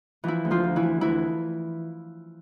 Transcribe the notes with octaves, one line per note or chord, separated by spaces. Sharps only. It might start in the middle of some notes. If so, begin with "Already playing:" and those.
E3 F3 E4
D2
F3 F4
D2
E3 E4
D2
D2 E3 E4